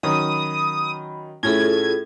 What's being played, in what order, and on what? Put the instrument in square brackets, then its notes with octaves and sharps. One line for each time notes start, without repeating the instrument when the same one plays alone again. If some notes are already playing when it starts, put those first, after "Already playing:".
[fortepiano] D#3 F#3 C#4 [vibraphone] B5 [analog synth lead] D#6
[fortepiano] A2 C#4 E4 [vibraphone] F4 G#4 A4 [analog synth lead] G#6